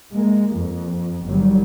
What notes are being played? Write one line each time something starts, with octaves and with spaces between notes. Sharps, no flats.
G#3 A#3
F2
G1 D#3 F#3 G3